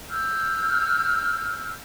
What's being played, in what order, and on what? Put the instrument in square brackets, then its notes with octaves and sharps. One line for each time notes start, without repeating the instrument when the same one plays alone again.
[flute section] E6 F6 G6